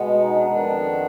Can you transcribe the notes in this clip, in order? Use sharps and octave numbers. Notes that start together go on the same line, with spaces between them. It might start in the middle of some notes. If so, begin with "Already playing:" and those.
Already playing: B2 G#3 B3
D#4
D4
F2 D#3 B3 D4